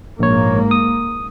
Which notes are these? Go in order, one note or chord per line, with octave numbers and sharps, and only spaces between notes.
A#1 G#2 A#3 C#5
D#6